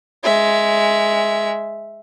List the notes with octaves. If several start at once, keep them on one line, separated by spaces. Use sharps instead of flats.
G#3 E5